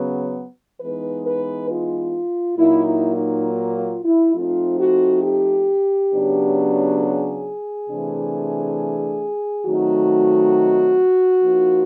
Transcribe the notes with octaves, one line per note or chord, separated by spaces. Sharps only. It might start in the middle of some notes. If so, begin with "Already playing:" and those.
Already playing: C#3 F#3 B3
E3 G#3 B3 D#4 B4
B4
F4
A#2 F#3 A#3 D#4 E4
E4
D#4
F4
E4
F3 A3 C4 D#4 F4
F#4
G4
C#3 F#3 B3 D4
G#4
C3 E3 A3 D4
D#3 F#3 A3 C4 D#4 F#4
F3 A#3 D#4